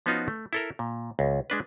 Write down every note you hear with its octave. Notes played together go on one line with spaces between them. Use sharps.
F3 B3 C#4 D#4 F4 F#4
A3
E4 A4 A#4
A#2
C#2
G#3 D4 B4